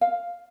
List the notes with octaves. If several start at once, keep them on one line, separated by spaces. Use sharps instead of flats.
F5